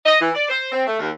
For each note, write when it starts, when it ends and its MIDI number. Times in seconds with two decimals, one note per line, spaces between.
0.06 0.15 75
0.20 0.29 52
0.34 0.46 74
0.49 0.69 72
0.71 0.84 60
0.87 0.97 57
0.99 1.09 39